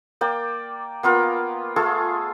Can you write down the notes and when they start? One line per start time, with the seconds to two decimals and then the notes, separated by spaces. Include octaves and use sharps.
0.21 A#3 D5 G5
1.03 A#3 B3 F4 A#4
1.76 A3 F4 G#4 A4